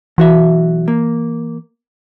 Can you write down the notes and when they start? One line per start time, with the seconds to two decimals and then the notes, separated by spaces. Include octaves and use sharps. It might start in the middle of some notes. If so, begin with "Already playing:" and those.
0.18 B1 E3 F#4 E5
0.88 A#3